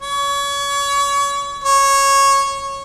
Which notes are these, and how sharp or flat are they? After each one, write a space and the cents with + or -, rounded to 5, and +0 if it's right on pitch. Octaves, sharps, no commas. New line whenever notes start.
C#5 +30
C#5 -10